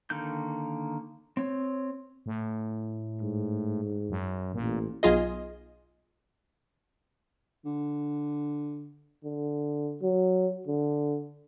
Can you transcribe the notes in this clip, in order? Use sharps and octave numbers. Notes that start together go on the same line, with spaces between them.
D3 D#3 A#3 G6
C4 C#5
A2
G#2
F#2
A1 A#2
B1 F4 G#4 D#5
D3
D3
F#3
D3